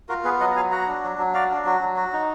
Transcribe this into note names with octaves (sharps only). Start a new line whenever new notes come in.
F4 F#4 A#4
B3 G#4 B4
F#3 D#5 F#5
A#5
F#3 F5 G#5
F#4 F#5 A#5
D4
F#3
F#3
F#4 D5 F5
D4
F#3 F#4
F#3
F#4
D#4